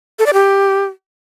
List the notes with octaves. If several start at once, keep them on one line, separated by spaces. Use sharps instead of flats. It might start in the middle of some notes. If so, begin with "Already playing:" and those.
A4
D5
G4